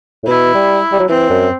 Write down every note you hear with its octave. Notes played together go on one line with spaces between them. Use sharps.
A2
B2 E4
G3
G3
F#3
E3 C4
F#2